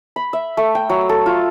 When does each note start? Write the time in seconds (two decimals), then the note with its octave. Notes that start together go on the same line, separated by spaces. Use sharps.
0.16 B5
0.33 E5
0.57 A3
0.75 G5
0.89 F#3
1.09 A4
1.26 F4